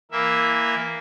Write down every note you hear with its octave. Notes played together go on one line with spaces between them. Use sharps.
E3 A#3 E5